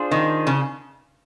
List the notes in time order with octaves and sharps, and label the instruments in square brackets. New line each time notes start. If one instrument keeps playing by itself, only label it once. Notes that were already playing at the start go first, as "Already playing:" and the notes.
Already playing: [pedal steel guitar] D4 F4 G#4 C5
[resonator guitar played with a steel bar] D#3
C#3